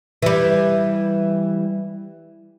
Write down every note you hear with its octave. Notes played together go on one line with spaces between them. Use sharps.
E3 G3